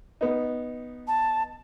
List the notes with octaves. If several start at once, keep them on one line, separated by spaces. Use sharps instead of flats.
B3 D#4
A5